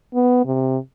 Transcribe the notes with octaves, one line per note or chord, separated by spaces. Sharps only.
B3
C3